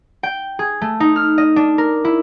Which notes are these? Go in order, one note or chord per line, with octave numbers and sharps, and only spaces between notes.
G5
G#4
A3
D#4
F6
D#5
D4
A#4
E4